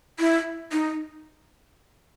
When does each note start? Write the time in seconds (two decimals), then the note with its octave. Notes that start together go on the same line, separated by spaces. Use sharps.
0.20 E4
0.72 D#4